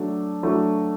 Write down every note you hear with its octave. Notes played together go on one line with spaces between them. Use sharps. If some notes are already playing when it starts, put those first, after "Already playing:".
Already playing: F#3 A3 D4
F#3 A3 D4 F#4